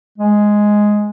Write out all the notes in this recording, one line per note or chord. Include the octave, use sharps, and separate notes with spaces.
G#3